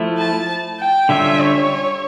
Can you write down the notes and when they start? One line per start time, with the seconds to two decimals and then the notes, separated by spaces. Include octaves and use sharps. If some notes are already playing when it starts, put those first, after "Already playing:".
Already playing: F3 A3 E4
0.17 A5
0.79 G5
1.09 D3 G3 C#4 F4 E5
1.40 C#5